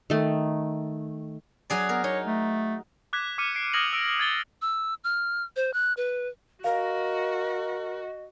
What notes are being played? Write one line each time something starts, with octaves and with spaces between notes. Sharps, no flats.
D#3 A3
F#3 G#4 D5
B3 A#4
D#4 C#5
A3
D6 F#6 G#6 B6
D6 F6 C#7 D#7
C7 D7
D#6 F6 G#6 A#6 F7 F#7
E6 D7
G#6 A6 G7
E6
F6
C5
F#6
B4
F#4 A#4 D#5 F5